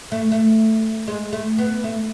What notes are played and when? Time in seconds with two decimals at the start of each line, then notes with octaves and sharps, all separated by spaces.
0.12 A3
0.32 A3
1.08 G#3
1.33 A3
1.58 B3
1.84 A3